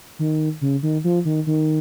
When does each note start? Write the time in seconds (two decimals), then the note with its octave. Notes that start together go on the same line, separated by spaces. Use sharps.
0.19 D#3
0.61 C#3
0.83 D#3
1.04 F3
1.25 D#3
1.47 D#3